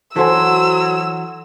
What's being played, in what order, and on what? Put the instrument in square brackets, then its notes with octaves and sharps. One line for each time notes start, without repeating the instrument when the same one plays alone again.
[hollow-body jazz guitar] E3 F#4 [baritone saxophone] F#3 [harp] A4 C5 G#5 [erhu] E6